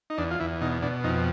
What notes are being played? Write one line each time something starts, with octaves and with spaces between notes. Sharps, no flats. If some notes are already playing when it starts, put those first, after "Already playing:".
D#4
E2 D4
F4
E2 E4
B2 D#4
B2 D4
F2 D#4